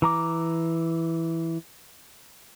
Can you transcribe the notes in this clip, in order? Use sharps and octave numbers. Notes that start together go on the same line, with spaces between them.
E3 A#5 D6